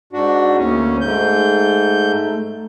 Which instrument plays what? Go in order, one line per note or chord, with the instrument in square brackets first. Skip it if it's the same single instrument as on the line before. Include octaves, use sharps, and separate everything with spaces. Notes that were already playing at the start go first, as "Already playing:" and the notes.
[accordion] G#2 D4 F#4
[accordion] D2 C#4 [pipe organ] A#3
[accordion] G#2 G6 [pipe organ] A3